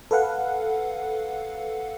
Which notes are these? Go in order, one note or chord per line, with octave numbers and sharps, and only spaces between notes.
A4 B4 F5 F#5